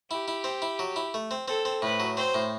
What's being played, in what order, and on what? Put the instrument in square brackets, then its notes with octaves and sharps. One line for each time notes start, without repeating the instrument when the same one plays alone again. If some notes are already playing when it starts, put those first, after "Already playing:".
[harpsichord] E4 [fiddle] G4
[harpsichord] E4
C4
E4
F#3
E4
A3
C4
[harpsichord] C4 [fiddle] A4
[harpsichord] C4
[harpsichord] A2 [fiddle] B4
[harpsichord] F#3
[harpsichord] C4 [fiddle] C5
[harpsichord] A2